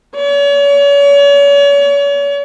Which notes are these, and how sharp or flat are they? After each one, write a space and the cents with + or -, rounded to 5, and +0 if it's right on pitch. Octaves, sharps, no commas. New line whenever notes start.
C#5 +40